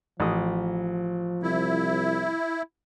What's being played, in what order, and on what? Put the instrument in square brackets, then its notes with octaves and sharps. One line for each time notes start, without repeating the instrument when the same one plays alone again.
[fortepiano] A1 D#6 [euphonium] F3
[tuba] C2 [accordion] E4